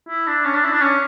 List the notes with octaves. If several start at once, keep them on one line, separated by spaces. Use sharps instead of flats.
E4
D4
C#4
D4
E4
D4
C#4